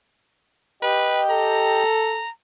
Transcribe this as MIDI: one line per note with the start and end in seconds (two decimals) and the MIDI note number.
0.83 1.83 67
0.83 1.23 71
0.83 1.83 75
0.83 1.83 79
1.30 2.23 69
1.30 2.30 82